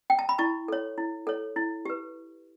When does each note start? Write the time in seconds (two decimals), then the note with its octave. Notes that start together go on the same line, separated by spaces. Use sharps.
0.10 G5
0.19 A5
0.29 B5
0.38 E4 A5 C#6
0.68 A4 C#5
0.98 E4
1.27 A4 C#5
1.56 E4
1.85 G4 B4